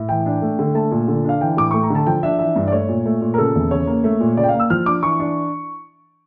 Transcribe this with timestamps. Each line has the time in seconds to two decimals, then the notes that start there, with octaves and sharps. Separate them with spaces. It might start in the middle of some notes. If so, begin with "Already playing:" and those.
Already playing: A2
0.09 E3 G5
0.26 D4
0.42 A3
0.59 D3
0.75 A3 A5
0.91 A#2
1.08 D3
1.25 D4 F5
1.41 E3 G5
1.57 A2 D6
1.71 A3 C#6
1.83 A#5
1.90 D3 A5
2.07 F3 G5
2.23 D4 E5
2.39 E3 E5
2.56 G2
2.68 D5
2.72 A3 C#5
2.89 A#2
3.06 A3
3.21 A#2
3.34 A#4
3.38 C#3 A4
3.55 E2
3.71 C#3 C#5
3.87 A#3
4.04 A3
4.20 A#2
4.37 C#3 D5
4.44 G5
4.49 A#3 F5
4.60 E6
4.70 F3 F6
4.86 D4 D6
5.03 E3 C#6
5.19 D4